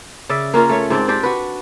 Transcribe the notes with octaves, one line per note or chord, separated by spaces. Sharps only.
C#3 D5 E5
A#3 C#4 F4 A#4
A3 C#5
G#2 C4 D4 D5
D4 G4 C5 D5
F#4 B4